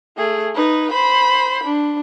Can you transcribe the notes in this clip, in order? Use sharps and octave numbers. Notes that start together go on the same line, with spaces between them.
A3 G#4
D#4 B4
C5 B5
D4